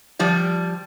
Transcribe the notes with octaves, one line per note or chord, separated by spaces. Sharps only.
F3 G3 D5